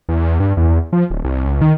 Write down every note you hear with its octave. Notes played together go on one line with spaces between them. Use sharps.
E2
G2
E2
F3
D1
C2
C#2
D#3